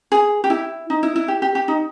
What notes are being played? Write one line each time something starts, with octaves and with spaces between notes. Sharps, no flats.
G#4
G4
E4
D#4
E4
E4
G4
G4
G4
D#4